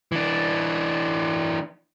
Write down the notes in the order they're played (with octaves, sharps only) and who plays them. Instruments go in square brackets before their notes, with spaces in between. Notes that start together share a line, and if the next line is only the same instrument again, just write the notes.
[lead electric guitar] E3 D4